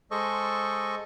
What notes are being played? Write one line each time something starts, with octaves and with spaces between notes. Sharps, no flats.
G#3 A4 C5 D#5 C#6